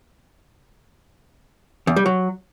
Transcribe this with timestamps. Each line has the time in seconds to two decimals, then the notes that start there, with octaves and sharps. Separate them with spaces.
1.87 E2
1.96 G3
2.06 F#3